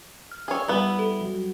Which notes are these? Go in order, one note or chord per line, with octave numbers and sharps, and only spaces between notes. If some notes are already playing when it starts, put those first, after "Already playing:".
F6
G#4 C#5 D5 G5 E6
G3 B3 E4 B4
A4
F#3